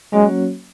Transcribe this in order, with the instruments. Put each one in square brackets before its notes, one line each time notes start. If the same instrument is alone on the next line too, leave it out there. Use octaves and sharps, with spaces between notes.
[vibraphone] F#3 A#3 C#4 F#4 C#5 [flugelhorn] G#3